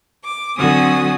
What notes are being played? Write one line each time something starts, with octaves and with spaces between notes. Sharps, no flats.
D6
D3 F#3 C4 F#4 G#5 D#6